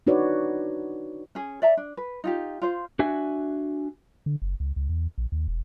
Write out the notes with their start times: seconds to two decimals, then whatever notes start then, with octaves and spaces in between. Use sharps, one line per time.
0.07 D4 D#4 F#4 B4 C#5 D5
1.35 C#4 G#4
1.62 D5 E5 A#5
1.77 D4
1.97 B4
2.24 D#4 F4 G4
2.62 F4 C5
2.99 D4 F#4 E5 G#5
4.26 D3
4.42 F#1
4.60 C#2
4.76 C#2
4.89 E2
5.18 A#1
5.32 D#2
5.48 E1